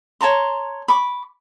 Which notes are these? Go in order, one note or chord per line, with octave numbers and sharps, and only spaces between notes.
C#5 A5 A#5 C6
B5 C#6 D6